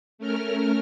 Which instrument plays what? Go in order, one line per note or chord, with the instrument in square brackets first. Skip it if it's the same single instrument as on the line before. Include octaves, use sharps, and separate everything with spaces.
[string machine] A3 C#4 A#4 F6